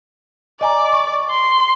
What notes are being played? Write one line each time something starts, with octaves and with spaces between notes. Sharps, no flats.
D5 D#5 G#5 A#5
C#6
C6